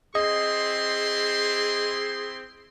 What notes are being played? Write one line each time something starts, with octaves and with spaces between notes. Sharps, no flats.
C4 E4 G#4 D#5 C6